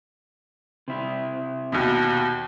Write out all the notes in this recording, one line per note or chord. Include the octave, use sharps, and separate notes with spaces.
C3 E4
D#2 B2